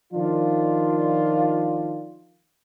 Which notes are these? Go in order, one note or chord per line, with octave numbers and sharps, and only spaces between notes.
D#3 F3 D4 F4